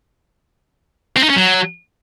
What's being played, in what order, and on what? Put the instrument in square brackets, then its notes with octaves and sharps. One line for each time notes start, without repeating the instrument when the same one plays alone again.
[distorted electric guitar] C4
D#4
C#4
F#3